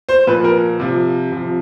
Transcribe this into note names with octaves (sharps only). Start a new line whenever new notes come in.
C5
A#2 F3 B4
A#4
C3 F3
C3 F3